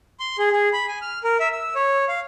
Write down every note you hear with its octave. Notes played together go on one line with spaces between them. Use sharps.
C6
G#4
G#4
B5
G#5
F6
A#4
E5
E6
C#5
F5